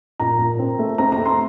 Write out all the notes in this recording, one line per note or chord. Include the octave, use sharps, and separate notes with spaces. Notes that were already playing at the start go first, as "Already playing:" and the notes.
A#2 A#5
A#2
C4
A3
C4 A#5
A#5
A3
C6